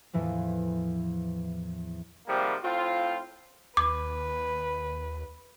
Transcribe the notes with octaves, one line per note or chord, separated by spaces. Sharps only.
E2 A2 E3 F3
G#2 C3 F3 G3 A#3
A2 C4 F4
D#2 B4 D6